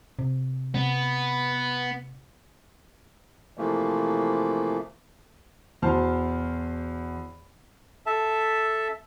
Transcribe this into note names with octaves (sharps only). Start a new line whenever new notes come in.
C3
C3 B3
C3 E3 F3 A3 A#3
E2 B2 C5 A5 F6
A4 E5 A5